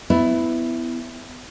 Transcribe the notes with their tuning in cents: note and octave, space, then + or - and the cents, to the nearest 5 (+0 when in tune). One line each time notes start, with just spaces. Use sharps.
B3 +25 E4 +0